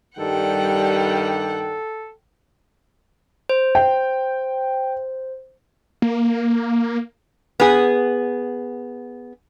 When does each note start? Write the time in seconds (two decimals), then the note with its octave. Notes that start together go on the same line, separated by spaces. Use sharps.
0.18 G2 D#3 G3 A4 F#5 G5
3.49 C5
3.75 G5
6.02 A#3
7.60 B3 G#4